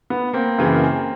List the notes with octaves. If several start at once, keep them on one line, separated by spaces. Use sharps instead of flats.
B3
A#3 C4
F#2 C#3 E3